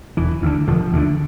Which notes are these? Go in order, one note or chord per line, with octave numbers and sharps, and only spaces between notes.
E1 E3
D2 D3
E1 F3
D2 D3